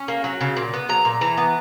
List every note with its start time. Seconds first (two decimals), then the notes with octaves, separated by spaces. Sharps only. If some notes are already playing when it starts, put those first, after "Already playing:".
Already playing: C#4
0.08 A#3
0.24 F#3
0.41 C#3
0.57 A#2
0.74 B3
0.89 F#3 A#5
1.05 A#2
1.21 E3 A#5
1.37 B3